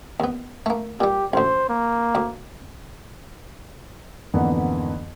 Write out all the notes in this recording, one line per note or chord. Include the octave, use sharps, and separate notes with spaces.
D#2 B3
A3 A#3
A#2 G3 G4
A1 D2 C5
A#3
D2 D6
F2 G#2 D3 E3 A#3 B3